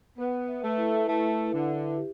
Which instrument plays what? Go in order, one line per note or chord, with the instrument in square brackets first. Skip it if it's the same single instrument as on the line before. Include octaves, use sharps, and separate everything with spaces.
[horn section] B3 [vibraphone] B4
[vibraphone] E5
[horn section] A3
[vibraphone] E4
[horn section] A3 [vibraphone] E4
[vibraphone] B4
[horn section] D3
[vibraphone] E5
G4